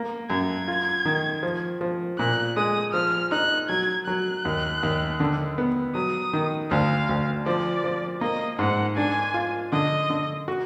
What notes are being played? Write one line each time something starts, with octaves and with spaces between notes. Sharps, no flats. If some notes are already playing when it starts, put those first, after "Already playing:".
Already playing: A#3
F#2 G#6
F4
D#3
F3
F3
A#2 F#6
G#3 D#6
F3 F6
D#4 F#6
F#3 G#6
F#3 F#6
D#2
D#2
D3
B3
F#3 D#6
D#3
D2 F5
D2
F3 D5
F3
A#3 D#5
G#2 F#5
D4 G#5
F4
D3 D#5
D3
F#4